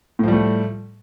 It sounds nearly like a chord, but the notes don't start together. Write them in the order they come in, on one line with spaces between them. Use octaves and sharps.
A2 F3 G3 A3